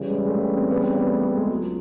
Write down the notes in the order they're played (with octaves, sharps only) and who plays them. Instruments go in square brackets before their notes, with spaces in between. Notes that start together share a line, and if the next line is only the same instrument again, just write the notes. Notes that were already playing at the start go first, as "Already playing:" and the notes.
Already playing: [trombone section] C#3 E3 G3
[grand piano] G#3
G#3
A3
C4
B3
C4
B3
A3
A3
G#3
[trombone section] C#2 [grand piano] F#3